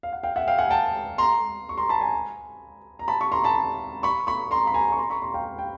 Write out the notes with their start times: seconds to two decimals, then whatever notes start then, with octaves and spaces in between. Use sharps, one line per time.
0.03 F5
0.13 F#5
0.23 F5 G5
0.36 E5 F#5
0.47 F5 G5
0.59 F#5 G#5
0.70 G5 A5
1.18 A#5 C6
1.69 C#6
1.77 A#5 C6
1.89 A5 B5
2.01 G#5 A#5
2.99 A#5
3.08 A5 B5
3.21 B5 C#6
3.32 A#5 C6
3.44 A5 B5
4.03 B5 C#6
4.27 B5 C#6
4.51 A#5 C6
4.67 B5
4.74 G#5 A#5
4.92 C#6
4.98 A#5 C6
5.10 B5 C#6
5.22 A#5 C6
5.34 F5 G5
5.58 G5